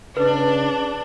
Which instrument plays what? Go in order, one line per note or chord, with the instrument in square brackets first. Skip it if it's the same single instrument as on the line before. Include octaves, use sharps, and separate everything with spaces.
[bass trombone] C#3 [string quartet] D4 [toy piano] B4